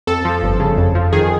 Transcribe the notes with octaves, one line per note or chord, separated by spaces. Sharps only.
F2 A4
F3
G1
C#3
F2
F3
D#3 G#4